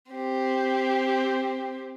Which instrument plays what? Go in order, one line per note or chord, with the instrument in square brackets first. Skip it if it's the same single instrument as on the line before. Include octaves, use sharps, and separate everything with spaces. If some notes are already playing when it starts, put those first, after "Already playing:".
[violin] C4 G4